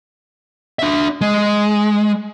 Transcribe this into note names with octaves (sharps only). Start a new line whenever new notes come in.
D4 E5
G#3